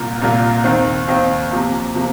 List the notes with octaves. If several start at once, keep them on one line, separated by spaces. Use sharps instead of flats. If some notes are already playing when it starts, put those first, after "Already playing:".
Already playing: C2 A#2 A#3 F4
C2 A#2 A#3 F4
D#2 D#3 C4
D#2 D#3 C4
C3 F3 A#3
C3 F3 A#3